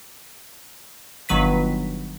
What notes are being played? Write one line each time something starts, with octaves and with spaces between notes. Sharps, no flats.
G1 D#3 F#3 B4 B6